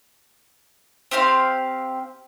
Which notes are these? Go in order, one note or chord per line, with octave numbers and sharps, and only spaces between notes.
C4 G4 F5 C6